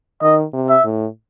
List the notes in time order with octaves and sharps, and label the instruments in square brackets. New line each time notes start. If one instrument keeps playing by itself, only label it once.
[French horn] D#3 [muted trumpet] D#5
[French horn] C3
[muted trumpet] E5
[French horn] A2